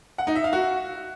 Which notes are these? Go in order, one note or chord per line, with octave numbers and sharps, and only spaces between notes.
F#5
D#4
E5
F5
F#4